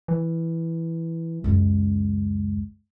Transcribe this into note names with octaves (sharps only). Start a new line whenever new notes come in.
E3
C#2 F#2 G#3